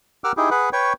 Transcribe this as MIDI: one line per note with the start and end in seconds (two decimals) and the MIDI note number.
0.24 0.32 67
0.24 0.32 70
0.24 0.32 78
0.24 0.32 86
0.24 0.32 88
0.24 0.32 89
0.37 0.50 63
0.37 0.50 64
0.37 0.50 67
0.37 0.50 68
0.51 0.70 68
0.51 0.70 71
0.51 0.70 78
0.73 0.93 71
0.73 0.93 73
0.73 0.93 79
0.73 0.93 85